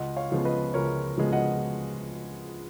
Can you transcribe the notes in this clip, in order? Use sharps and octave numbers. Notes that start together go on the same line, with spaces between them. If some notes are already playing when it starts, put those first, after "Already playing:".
Already playing: C#2 D#5 F#5
C#5 F5
C#3 F3 G#3 B3
B4 D#5
C#2 A#4 C#5
C#3 F3 G#3 B3
D#5 F#5